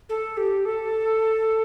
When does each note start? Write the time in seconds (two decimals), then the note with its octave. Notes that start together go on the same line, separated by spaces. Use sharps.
0.09 A4
0.37 G4
0.65 A4